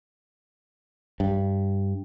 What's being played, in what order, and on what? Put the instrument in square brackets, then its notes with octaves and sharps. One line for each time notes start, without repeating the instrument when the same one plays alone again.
[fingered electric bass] G2